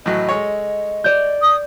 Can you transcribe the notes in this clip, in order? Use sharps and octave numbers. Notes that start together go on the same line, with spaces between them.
A2 E3 F#3 D#5
G#3 A4 C#5
D5 G6
D#6